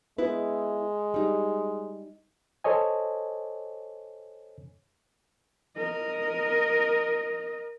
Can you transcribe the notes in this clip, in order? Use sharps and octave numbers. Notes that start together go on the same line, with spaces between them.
G#3 B3 E4 B4
G3 D#4
A4 C5 C#5 D#5 G#5
A#4 D#5